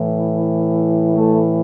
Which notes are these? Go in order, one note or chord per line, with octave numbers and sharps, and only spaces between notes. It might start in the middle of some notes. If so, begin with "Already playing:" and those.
Already playing: A2 E3
A3 A4